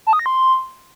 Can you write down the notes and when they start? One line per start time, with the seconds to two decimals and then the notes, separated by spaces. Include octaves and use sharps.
0.07 A5
0.13 D#6
0.19 A#6
0.26 C6